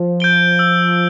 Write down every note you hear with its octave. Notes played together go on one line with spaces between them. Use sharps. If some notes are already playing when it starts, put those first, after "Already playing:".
Already playing: F3
G6 D7 G7
E6